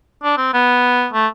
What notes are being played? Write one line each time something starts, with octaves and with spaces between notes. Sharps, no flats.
D4
C4
B3
A3